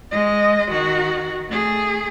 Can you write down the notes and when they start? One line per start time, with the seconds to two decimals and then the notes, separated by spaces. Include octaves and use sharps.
0.11 G#3 D#5
0.71 D#3 F#4
1.49 A3 G#4